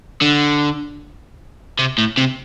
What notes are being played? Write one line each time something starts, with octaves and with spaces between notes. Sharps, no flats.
D3
C3
A2
C3